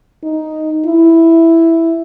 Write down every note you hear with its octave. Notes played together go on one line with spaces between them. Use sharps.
D#4
E4